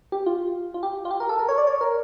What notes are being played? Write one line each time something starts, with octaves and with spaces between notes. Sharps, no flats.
G4
F4
F4
G4
F4
G4
A#4
A4
A#4
C#5
D5
C#5
A#4